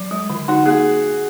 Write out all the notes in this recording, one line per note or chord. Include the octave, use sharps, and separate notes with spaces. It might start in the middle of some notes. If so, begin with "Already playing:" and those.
Already playing: F#3
G#3
D3
D#4 F#4
A#3 G#4